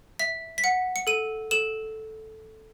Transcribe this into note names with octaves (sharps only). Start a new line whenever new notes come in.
E5 B6
B6
F#5 C#7
C#7
A4 D#7
A4 E7